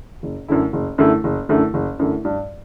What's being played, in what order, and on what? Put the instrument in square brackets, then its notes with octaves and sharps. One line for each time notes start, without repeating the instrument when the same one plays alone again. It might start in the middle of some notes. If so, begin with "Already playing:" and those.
[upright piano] F#1
F#2 D3 A3 E4
F#1
F#2 D3 A3 E4
F#1
F#2 D3 A3 E4
F#1
F#2 D3 A3 E4
G2